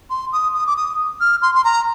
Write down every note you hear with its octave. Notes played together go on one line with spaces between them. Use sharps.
C6
D#6
D#6
D6
D#6
F6
C6
C6
A#5